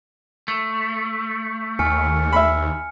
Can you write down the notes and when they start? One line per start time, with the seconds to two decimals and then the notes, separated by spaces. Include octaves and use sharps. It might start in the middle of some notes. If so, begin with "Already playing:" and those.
0.48 A3
1.79 D#2 G#5 F6 C#7
2.32 E5 B5